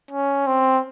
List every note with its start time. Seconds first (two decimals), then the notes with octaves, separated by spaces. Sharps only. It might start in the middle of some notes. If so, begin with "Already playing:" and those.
0.11 C#4
0.47 C4